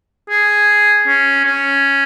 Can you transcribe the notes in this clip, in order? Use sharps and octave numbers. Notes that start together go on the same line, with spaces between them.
G#4
C#4
C#4